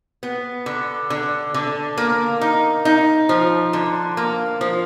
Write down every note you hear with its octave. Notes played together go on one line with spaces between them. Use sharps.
B3
D3
D3
D3
A#3
D#4
D#4
F3
D3
A#3
F3